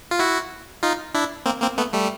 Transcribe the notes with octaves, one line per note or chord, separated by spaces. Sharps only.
F4
E4 F#4
D#4 F4
D4 E4
A#3 C4
A#3 C4
A3 B3
G3 A3